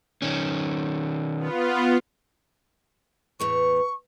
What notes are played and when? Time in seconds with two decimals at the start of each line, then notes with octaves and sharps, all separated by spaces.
0.22 D#3 C#4
1.38 B3 F4
3.40 E2 A2 E3 C#6